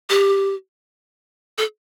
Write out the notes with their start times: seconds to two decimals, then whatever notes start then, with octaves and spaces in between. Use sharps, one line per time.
0.10 G4
1.58 A4